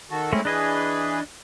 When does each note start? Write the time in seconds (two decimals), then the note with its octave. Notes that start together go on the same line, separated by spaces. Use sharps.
0.11 D#3 F#4 A4
0.33 G#3 A3 C4 C#4 E4
0.45 E3 D4 G#4 B4 D#5 G#5